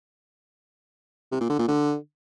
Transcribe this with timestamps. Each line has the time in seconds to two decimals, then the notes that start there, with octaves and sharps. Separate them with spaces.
1.31 C3
1.41 A#2
1.50 D3
1.59 A#2
1.68 D3